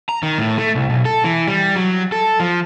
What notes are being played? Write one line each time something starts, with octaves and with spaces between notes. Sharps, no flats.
A#5
D#3
A2
A3
C2
B1
A4
E3
G3
F#3
A4
F3